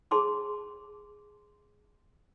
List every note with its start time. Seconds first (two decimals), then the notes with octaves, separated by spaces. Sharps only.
0.11 G#4 C#5 A5 C6 D6